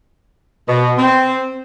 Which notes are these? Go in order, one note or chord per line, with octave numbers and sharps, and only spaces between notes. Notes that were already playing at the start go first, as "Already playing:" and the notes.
B2
C4